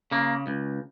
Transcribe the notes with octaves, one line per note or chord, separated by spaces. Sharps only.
C#3 A#3
C#2